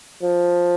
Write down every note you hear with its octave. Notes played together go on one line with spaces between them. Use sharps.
F3